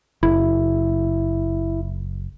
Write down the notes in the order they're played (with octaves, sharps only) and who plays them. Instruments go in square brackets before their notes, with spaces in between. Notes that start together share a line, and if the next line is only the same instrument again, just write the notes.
[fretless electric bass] F#1 [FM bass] E4